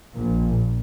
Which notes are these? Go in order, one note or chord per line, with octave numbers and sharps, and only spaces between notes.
A#1 A#2